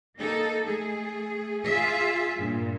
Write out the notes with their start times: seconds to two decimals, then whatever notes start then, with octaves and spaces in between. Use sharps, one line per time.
0.16 A#3 D#4 A4
0.64 A3 G#4
1.63 F4 G#4 E5
2.38 G2 A#2